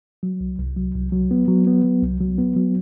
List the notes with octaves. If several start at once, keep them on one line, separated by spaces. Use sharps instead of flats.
F#3
C2
C2
F#3
C2
F#3
B3
F#3
B3
F#3
C2
F#3
B3
F#3